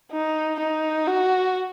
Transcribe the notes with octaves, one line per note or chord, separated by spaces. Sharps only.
D#4
D#4
F#4